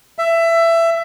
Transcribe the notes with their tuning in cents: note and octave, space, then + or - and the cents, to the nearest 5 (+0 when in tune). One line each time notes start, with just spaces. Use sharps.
E5 +20